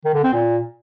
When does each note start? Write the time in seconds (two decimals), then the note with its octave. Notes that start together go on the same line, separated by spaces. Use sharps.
0.05 D#3
0.14 D3
0.24 C4
0.33 A#2